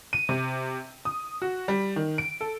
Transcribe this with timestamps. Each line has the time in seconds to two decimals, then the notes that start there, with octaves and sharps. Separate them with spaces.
0.13 D#7
0.29 C3
1.05 D#6
1.42 F#4
1.68 G3
1.96 D#3
2.18 D7
2.41 A4